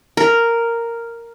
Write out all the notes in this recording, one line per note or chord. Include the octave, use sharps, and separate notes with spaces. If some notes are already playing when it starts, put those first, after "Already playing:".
A#4